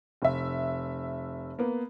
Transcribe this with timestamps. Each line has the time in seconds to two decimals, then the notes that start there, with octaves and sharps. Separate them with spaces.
0.22 F1 E5
1.59 A#3 B3